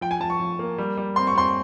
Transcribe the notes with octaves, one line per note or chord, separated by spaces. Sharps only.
F3 G5
G#5
F3 A5
C#6
F3
A#3
G3
G3
C4 C6
C#6
C4 C6